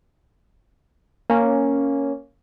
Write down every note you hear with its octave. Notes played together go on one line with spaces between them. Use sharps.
A#3 C#4